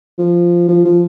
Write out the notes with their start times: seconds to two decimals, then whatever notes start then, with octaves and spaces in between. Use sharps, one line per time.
0.18 F3
0.68 F3
0.85 F3